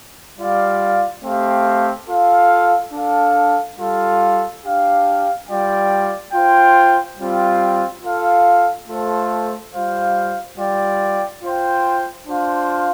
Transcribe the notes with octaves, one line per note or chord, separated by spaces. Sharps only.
G3 F4 D5 F5
A3 C4 G4 F5
F4 A4 F5
D4 A4 F5
G3 F4 A4 F5
D4 G4 F5
G3 F4 D5 G5
F4 C5 G5
G3 C4 F4
F4 A4 F5
A3 F4 A4 C5
G3 F4 C5 F5
G3 F4 D5 G5
F4 C5 G5
D4 F4 C5 F5